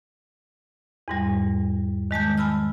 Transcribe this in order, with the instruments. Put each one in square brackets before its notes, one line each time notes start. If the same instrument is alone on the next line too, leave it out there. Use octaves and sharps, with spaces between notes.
[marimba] E2 G#2 G3
D#3 G#3 A5 G6
G#5 A5 B5 E6 F6